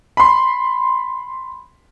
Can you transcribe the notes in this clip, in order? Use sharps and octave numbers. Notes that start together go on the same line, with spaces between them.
B5 C6